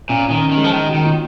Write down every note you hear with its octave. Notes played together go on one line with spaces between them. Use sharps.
A#2 C#4
D#3 C#4
C#4
D#3
G#3
F3
D#3 D#4
F#3
D#3
A#2